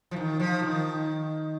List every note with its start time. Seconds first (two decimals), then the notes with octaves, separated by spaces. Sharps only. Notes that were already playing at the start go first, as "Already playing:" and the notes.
0.11 F3
0.16 D#3
0.40 F3
0.63 D#3